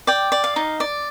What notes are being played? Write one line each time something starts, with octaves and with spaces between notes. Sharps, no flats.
D5 G5
D5
F5
D#4
D5